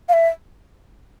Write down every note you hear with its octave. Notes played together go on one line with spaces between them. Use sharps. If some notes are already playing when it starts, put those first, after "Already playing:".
F5
E5